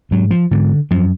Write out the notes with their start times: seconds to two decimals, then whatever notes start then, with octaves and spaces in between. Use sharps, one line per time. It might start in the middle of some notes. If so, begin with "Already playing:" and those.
0.11 G#2 F#3
0.31 F3
0.51 G#2 D3
0.91 F#2 F3